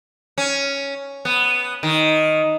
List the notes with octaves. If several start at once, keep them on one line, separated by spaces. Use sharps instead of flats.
C#4
B3
D#3